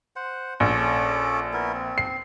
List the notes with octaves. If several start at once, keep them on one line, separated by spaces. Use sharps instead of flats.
C5 F#5
A#1 C#4 A4 D6
B3 E4 A#4
C4
C7